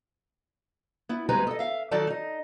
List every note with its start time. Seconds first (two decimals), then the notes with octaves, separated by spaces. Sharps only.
1.09 B3 E4
1.29 D2 G3 G#3 B4 G#5 A#5
1.47 A4 D#5
1.59 E5 F5
1.91 D#3 F#3 D#4 A4 D5 A5
2.07 D#4 D#5